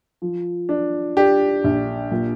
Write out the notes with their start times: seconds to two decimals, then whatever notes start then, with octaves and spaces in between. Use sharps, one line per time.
0.22 F3
0.69 D4
1.17 D4 G4
1.64 A#1
2.11 A#2